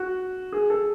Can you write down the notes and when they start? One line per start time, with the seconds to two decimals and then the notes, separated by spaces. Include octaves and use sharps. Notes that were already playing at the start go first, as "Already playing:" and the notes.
Already playing: F#4
0.52 G#4
0.70 A4